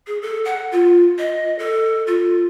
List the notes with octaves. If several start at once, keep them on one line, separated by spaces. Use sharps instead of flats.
G#4
A4
F#5
F4
D#5
A4
F4